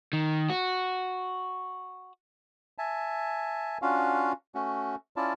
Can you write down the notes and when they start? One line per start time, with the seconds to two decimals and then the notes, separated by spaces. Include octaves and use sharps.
0.13 D#3
0.50 F#4
2.78 E5 G#5 A5
3.82 C#4 D4 F4 F#4 F5
4.55 A3 C#4 F#4
5.16 C#4 E4 F4 D5 A5